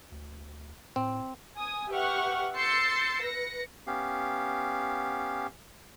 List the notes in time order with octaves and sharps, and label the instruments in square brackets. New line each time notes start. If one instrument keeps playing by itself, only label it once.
[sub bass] D2
[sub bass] A2 [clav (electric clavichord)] C4
[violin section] G#5 D#6
G4 B4 E5 F#5 C#6 F6
C6 E6 G6 A6 C7 C#7
B4 A#6 C#7
[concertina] B3 C#4 G4 F5